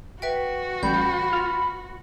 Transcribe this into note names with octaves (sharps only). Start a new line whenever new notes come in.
F#4 B4 E5 G5
A1 G3 B5 G6
F4